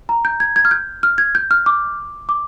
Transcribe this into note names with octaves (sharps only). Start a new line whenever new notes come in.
A#5
G6
G#6
G#6
F6
G6
F6
G#6
G6
F6
D6
D6